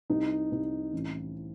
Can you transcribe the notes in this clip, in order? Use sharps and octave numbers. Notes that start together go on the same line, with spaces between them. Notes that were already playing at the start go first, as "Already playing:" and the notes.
C2 D#4
C2
A1